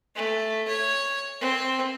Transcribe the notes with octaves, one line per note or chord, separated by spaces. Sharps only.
A3
C#5
C4